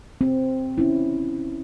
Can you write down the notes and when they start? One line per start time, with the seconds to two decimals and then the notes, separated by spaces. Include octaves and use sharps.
0.21 C4
0.78 C#4 E4